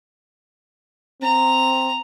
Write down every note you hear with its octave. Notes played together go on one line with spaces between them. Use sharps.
C4 A#5